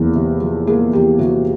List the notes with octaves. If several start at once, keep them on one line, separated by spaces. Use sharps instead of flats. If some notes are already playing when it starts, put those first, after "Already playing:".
Already playing: E2 A#3
C3
F3
A#3 G#4
E2 G4
C3 F#4